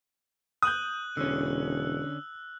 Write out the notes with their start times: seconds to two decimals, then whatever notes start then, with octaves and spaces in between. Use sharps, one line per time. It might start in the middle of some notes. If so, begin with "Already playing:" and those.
0.62 D#6 F#6 G6 F#7
1.17 E1 D3 C#4 E6